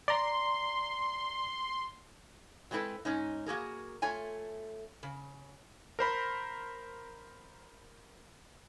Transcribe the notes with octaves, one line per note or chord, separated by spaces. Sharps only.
D5 A#5 C6
F#3 G#3 C4 E4 A4 B4
G#2 C#4 D#4
A#3 F#4 G#4 A#4
A3 F4 C#5 G#5
C#3
A#4 C5 B5